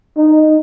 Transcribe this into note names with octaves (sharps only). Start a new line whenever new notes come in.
D#4